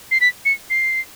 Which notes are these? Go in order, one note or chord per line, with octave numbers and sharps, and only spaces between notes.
C7
B6
C#7
C7